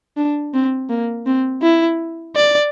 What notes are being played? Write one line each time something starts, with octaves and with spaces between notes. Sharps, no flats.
D4
C4
A#3
C4
E4
D5